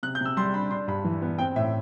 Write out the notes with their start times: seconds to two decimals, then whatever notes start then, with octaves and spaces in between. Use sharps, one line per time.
0.03 C3 F#6
0.15 G6
0.21 C3 E6
0.37 G3 C6
0.54 D4 B5
0.71 D4 C6
0.88 G2 B5
1.05 E3
1.22 B3
1.38 C4 G5
1.56 A2 E5